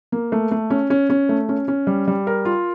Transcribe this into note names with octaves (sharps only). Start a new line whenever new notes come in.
A#3
A3
A3
C#4
C#4
C#4
A3
C#4
C#4
G3
G3
A#4
F4